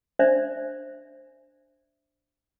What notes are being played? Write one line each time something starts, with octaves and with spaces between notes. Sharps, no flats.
D4 C5 D5 E5